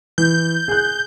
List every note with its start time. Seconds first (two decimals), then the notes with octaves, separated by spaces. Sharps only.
0.18 E3 G6
0.68 G#4 F#6